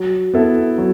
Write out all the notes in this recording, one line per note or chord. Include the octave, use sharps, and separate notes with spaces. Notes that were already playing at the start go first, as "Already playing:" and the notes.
Already playing: F#3
B3 E4 A4
F#3